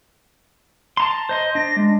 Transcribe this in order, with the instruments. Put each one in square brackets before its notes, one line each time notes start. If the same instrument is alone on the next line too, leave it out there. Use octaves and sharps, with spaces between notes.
[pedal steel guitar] A5 A#5 C6
C5 D#5 C6
[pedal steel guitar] D4 [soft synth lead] A#6
[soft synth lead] G#3